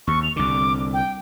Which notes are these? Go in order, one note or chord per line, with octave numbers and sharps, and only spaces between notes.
D#2 C#6
F7
C2 D3 D6
G5